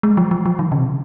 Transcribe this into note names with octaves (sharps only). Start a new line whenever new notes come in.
G#3
F3
F3
F3
D#3
C#3
C3